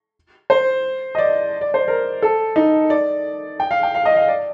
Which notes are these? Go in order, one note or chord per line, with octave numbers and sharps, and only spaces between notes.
C5
D#5
D5
D5
C5
A#4
A4
D#4
D5
G5
F5
G5
F5
D#5
F5
D5